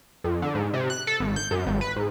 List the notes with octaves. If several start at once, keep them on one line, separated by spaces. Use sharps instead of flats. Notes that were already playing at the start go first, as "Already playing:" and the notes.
F2
D3
G#2
C3
F#6
A4
G#1
G6
F#2
G#1
B4
G#2